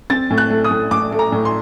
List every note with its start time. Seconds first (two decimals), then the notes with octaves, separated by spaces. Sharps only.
0.10 C4 A6
0.30 A2
0.38 F#6
0.50 A3
0.64 D#6
0.71 A2
0.91 A2 D6
1.12 A3
1.19 A#5
1.32 A2
1.45 C6